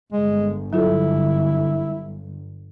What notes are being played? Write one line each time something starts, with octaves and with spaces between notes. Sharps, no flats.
G1 G#3
F#3 E4 F4 A4